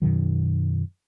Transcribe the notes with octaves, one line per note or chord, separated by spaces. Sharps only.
F#2 B2 D#3 F#3